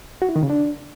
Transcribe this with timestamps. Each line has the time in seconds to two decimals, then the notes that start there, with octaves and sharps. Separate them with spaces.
0.22 F#4
0.29 E4
0.36 D#3
0.43 C#3
0.50 D4